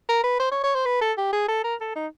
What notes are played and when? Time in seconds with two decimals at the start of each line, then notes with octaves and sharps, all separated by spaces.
0.09 A#4
0.24 B4
0.40 C5
0.52 C#5
0.63 C#5
0.75 C5
0.86 B4
1.01 A4
1.17 G4
1.33 G#4
1.49 A4
1.64 A#4
1.81 A4
1.96 D#4